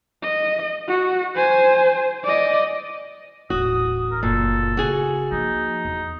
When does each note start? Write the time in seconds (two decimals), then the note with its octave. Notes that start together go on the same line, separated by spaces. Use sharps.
0.23 D#5
0.88 F#4
1.35 C5 G#5
2.24 D5 D#5
3.50 D#1 A1 F#4 D#6
4.11 A#4
4.23 F#1 A#2 A4
4.77 C#3 F#4 G#4
5.32 F3 A#3 D#4
5.85 E2